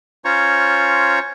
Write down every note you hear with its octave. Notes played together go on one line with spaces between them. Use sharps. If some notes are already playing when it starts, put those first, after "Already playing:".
C#4 F4 C5 C#5 A#5 C#6